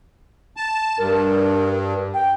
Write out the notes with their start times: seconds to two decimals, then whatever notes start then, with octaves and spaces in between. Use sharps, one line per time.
0.57 A5
0.98 G2 A#4
2.14 G5